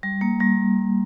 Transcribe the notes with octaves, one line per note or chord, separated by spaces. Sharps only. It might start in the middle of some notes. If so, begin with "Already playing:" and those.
G3
A#3
G3